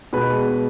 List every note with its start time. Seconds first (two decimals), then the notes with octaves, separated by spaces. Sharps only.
0.13 B2 G#3 B4